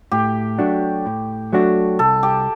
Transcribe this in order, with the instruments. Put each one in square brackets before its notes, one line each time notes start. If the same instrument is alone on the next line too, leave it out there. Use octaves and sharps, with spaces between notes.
[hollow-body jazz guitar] A2 [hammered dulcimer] G4
[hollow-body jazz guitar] F#3 A3 D4 F#4
A2
F#3 A3 D4 F#4
[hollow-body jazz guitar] C2 [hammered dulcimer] A4
[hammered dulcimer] G4